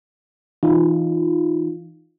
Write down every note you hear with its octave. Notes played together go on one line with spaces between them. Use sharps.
E3 D#4 F4